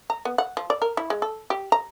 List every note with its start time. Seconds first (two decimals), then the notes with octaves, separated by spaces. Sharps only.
0.10 A#5
0.25 B3
0.38 F#5
0.57 F3
0.70 D5
0.82 A#4
0.97 E4
1.10 G#3
1.22 A4
1.50 G4
1.72 A#5